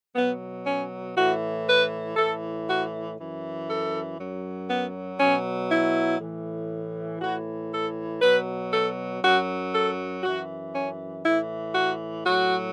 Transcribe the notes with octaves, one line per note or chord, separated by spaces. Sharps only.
B2 F#3 B3
C#4
A2 E3 F#4
B4
A2 E3 A4
F#4
F#2 E3
A4
F#2 F#3
B3
B2 F#3 C#4
E4
A2 E3
A2 E3 F#4
A4
B2 F#3 B4
A4
F#2 F#3 F#4
A4
F#2 E3 F#4
C#4
A2 E3 E4
F#4
A2 F#3 F#4